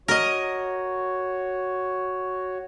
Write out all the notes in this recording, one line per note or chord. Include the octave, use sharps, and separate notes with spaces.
F#4 A#4 C#5 D#5